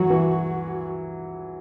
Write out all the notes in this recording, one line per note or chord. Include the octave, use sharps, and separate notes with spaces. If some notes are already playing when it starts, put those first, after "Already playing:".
Already playing: E3 F#3 F#4
E3